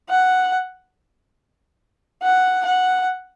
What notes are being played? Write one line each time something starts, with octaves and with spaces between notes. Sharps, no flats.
F#5
F#5
F#5